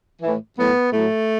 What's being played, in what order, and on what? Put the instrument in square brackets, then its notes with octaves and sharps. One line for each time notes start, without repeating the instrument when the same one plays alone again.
[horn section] A2 E3
A2 F#3 B3
A2 F#3 A3